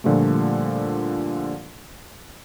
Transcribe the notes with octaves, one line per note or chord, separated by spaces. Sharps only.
A#2 D3 F3 G3 A3